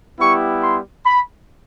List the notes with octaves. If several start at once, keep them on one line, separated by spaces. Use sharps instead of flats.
G3 B3 E4 G4 C#6
C6
B5